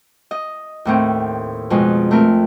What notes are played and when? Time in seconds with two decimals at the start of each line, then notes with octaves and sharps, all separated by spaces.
0.31 D#5
0.85 D#2 A2 C4
1.70 F2 B2 G#3
2.11 A3 C4 A#4